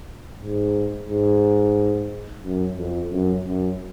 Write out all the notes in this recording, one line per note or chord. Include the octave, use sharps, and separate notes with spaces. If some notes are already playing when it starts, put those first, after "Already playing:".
G#2
G#2
F#2
F2
F#2
F#2